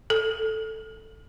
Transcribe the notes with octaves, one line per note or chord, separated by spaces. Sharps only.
A4